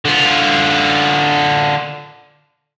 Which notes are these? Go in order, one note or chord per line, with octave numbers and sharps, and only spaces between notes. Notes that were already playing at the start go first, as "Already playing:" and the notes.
D3 F4